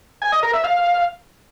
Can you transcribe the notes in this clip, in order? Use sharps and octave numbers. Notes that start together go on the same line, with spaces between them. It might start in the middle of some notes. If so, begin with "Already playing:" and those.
G#5
D#5
A#4
E5
F5